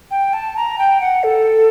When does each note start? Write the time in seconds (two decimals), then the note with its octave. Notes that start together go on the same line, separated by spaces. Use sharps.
0.11 G5
0.33 A5
0.56 A#5
0.78 G5
1.01 F#5
1.23 A4